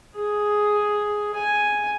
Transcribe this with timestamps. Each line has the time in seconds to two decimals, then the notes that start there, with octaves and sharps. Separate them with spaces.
0.16 G#4
1.35 G#5